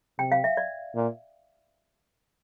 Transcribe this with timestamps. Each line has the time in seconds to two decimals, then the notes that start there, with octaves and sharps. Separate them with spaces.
0.19 C3 G5
0.32 F5
0.44 E5
0.57 D5
0.95 A#2